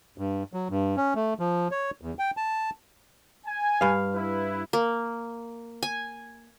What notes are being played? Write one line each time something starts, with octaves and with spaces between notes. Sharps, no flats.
G2
F#3
G2
C#4
A3
F3
C#5
E2
G5
A5
G#5
G2 F5
E4 B4
A#3
G#5